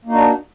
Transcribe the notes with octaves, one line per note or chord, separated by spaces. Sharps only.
A#3 D4 D#4 F#4